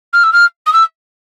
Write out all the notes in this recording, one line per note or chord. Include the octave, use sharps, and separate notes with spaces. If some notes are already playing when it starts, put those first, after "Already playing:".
F6
E6
F6
D#6
E6